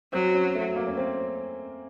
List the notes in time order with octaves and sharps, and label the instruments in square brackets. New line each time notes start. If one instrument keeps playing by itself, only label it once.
[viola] F#3 [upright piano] C4
[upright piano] C#4
A3
A#3
C#4
C4